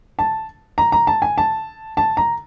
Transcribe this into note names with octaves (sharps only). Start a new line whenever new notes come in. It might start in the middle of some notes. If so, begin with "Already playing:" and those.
A5
A#5
A#5
A5
G#5
A5
A5
A#5